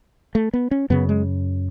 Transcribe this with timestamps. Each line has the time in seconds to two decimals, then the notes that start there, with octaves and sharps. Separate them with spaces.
0.35 A3
0.53 B3
0.71 C#4
0.90 F#2 C#3 B3
1.09 G#3